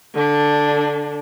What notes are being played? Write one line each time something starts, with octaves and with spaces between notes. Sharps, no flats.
D3 D4